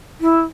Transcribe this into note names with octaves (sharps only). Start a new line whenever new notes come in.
E4